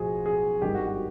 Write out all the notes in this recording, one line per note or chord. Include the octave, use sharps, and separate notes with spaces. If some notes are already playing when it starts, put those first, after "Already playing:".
Already playing: B1 A2 F3 F#4 G#4
G#4
G#1 G2 D#3 G3 G4
F#4
F#4